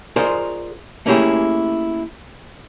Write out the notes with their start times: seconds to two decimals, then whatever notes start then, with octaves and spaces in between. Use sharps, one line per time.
0.16 F4 G#4 A#4 C5 D5 D#5
1.06 A3 A#3 C#4 E4 G4 G#4